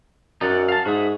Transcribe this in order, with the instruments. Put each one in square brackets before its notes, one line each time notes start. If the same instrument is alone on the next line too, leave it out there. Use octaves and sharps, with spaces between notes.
[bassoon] F#2 [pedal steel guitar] D#4 D5 F#5
[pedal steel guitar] F5 A5
[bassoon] G#2 [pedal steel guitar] F#4 E5 D#6